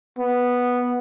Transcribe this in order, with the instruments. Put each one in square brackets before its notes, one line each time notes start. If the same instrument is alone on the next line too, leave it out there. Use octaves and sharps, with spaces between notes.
[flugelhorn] B3